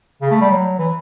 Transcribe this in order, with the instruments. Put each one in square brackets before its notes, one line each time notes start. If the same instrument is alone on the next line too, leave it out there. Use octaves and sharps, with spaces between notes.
[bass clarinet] C#3
A3
G3
F#3
E3